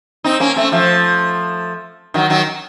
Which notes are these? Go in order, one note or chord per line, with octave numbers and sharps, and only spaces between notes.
C4 D#4
A#3 C#4
A3 C4
F3 A3
D#3 F#3
D#3 F#3